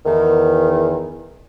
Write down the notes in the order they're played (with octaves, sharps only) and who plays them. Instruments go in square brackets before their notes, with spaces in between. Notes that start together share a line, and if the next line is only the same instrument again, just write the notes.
[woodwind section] E2 D#3